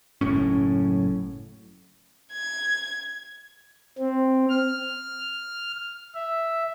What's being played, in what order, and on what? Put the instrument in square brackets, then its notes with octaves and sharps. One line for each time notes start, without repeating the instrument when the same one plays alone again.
[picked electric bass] F#1 F#2 A2 C#4
[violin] G#6
[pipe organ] C4
F6
E5